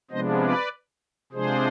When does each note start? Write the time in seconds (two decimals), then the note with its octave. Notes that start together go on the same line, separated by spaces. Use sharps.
0.11 C3 F3 G#3 B3 D4 C5 D#5
0.41 B4 D5
1.32 C3 F3 G#3 D4 G#4 C5